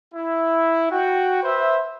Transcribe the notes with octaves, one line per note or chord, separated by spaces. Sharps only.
E4
F#4 G5
B4 C5 E5